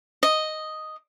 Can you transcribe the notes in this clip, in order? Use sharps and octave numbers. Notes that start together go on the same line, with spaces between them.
D#5